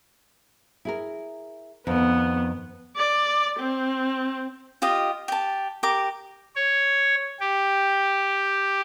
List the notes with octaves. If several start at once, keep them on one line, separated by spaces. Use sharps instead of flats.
E4 G#4 A#4
F2 D#3 B3
D5
C4
F4 G4 D#5 F5
G4 A5
G4 A#4 D6
C#5
G4